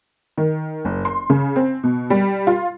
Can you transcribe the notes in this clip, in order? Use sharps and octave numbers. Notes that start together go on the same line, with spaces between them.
D#3
F#1
C6
C#3
C4
B2
G3
F4